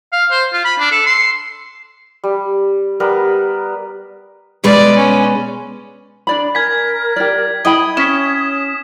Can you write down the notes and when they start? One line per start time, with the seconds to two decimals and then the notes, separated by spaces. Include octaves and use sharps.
0.13 F5
0.31 C5
0.53 F4
0.65 B5
0.79 D4
0.91 A4
1.06 C6
2.24 G3
3.00 G3 B3 A#4 B4
4.64 B2 G#3 B4 D5
4.97 C#4
6.27 D4 D5 B5
6.55 A#4 G#5 G#6 B6
7.16 G4 D5
7.65 E4 D#5 G5 B5 D#6
7.97 C#4 B6 E7